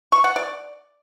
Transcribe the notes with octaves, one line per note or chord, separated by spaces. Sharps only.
C#6
F#5
D5